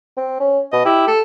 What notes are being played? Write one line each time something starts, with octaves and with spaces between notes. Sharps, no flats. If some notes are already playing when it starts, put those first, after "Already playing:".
C4
C#4
B2 D#5
E4 G4
A4